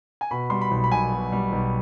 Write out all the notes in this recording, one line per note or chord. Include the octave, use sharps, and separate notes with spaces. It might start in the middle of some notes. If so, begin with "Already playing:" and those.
G#5
B2 B5
G3 C6
B5
B1
B5
B1 G#5
B2
G3
B1